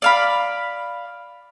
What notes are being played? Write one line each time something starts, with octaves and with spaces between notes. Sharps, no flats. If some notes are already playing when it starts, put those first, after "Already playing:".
D5 F5 B5